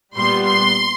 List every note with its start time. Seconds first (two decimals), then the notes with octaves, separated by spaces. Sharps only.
0.16 A#2 G3 B3 C6
0.46 C6